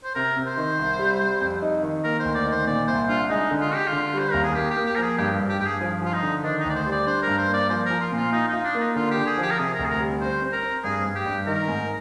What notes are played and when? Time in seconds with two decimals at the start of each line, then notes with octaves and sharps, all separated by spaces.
0.04 C5
0.15 C3 A#4
0.36 C3
0.47 C5
0.57 D#3
0.79 C2
0.99 G3
1.20 G3
1.41 F2
1.62 D#4
1.82 D#3
2.04 A#3 A#4
2.20 C5
2.25 D2
2.35 D5
2.46 D#3
2.51 C5
2.67 A#2 D5
2.88 C2 C5
3.08 D4 F4
3.30 G#3 D#4
3.51 D3
3.61 F4
3.71 D3 G4
3.87 D3 F4
4.14 G3
4.19 C5
4.31 D#2 A#4
4.44 G#4
4.55 A#3 G4
4.71 G4
4.76 A#3
4.86 G4
4.96 F3 A#4
5.02 G#4
5.18 G2 G4
5.39 G2
5.49 G4
5.60 G2 G4
5.65 G#4
5.81 F3
6.02 F3 F4
6.13 D#4
6.23 D3
6.44 D#3 D4
6.60 D2 D#4
6.70 D5
6.75 C5
6.86 G3
6.91 D5
7.06 D4 C5
7.23 G2 A#4
7.38 C5
7.48 A#3
7.54 D5
7.70 F3 C5
7.86 F3 A#4
8.01 F4
8.12 A#2 F4
8.32 D#4 F4
8.48 D#4
8.53 F4
8.64 D4
8.75 A#3
8.80 D#4
8.95 D3 F4
9.11 G4
9.17 D3
9.26 G#4
9.37 F3 G4
9.51 A#4
9.58 C3 G#4
9.74 D2 A#4
9.85 G#4
9.90 A#4
10.00 G3
10.21 C4 C5
10.42 C4
10.53 A#4
10.63 C4
10.84 G2 G#4
11.05 G2
11.15 G4
11.26 G2
11.46 D#3 A#4
11.68 G#2